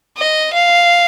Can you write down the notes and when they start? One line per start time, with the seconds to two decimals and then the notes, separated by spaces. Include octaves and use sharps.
0.18 D#5
0.53 F5